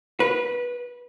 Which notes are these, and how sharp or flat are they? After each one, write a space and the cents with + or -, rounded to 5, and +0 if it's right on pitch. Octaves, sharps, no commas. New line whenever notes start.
B4 -20